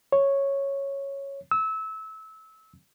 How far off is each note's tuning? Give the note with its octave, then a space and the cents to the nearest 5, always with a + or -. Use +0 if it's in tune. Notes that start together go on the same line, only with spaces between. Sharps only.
C#5 -5
E6 -25